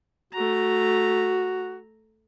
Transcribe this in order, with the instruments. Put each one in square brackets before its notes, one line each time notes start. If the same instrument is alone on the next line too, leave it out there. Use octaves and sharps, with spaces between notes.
[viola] A3 A#5 [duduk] F#4